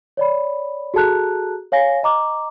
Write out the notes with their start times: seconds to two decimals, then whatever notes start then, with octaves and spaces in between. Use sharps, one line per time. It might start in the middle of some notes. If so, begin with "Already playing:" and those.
0.17 C#5 D5 B5
0.94 F#4 G#4 A4 A5 A#5 F#6
1.72 C#5 F5 G#5 A#6
2.03 D#5 A#5 D6